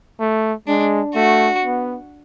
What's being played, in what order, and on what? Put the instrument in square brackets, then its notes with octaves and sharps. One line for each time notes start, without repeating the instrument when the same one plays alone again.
[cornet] A3
[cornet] G#3 [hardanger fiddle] D4
[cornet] A3 [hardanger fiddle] F#4
[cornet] B3